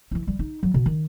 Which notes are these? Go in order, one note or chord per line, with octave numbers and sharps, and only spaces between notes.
E3 E4
G3
D#4
F#3
B2
D#3